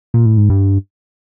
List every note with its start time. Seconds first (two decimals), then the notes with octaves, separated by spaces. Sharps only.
0.14 A#2
0.26 A2
0.37 G#2
0.50 G2